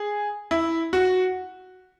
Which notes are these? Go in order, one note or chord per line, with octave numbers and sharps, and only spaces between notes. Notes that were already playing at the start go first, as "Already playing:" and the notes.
Already playing: G#4
E4
F#4